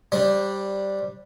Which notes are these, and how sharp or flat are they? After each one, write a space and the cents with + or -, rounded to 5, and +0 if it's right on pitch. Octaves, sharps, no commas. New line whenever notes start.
G3 +0 D4 +0 C5 +20